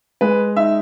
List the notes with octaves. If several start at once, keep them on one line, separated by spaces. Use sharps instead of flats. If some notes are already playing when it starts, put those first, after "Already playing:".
G#3 B4
D#4 E5